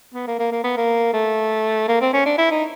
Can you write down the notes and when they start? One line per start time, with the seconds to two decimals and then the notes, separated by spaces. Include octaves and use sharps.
0.14 B3
0.27 A#3
0.39 A#3
0.52 A#3
0.64 B3
0.77 A#3
1.13 A3
1.88 A#3
2.01 C4
2.13 C#4
2.26 D4
2.38 E4
2.51 D#4